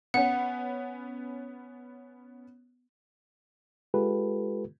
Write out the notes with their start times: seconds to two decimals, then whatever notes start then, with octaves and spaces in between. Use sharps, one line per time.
0.14 B3 C#4 F#5
3.94 G#3 F4 G4 A4 B4